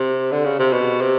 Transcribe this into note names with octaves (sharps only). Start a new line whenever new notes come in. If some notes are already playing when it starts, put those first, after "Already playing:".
Already playing: C3
D3
C#3
C3
B2
C3